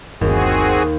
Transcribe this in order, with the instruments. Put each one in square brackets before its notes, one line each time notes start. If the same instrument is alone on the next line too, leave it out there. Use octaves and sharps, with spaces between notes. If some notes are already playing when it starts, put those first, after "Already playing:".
[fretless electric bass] G1 [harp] D#2 [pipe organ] C4 F#4 G#4